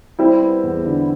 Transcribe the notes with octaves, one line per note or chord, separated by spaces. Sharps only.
G3 C4 E4
B3
E2
D3